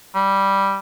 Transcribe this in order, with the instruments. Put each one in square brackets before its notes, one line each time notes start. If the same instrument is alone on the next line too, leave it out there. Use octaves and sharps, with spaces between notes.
[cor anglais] G3